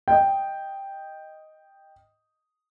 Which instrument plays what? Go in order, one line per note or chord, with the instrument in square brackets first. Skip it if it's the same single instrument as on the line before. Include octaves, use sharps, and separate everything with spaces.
[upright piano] D#5 G5